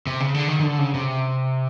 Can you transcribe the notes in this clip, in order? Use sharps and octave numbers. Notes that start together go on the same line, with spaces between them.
C3
C#3
D3
D#3
D#3
D3
C#3
C3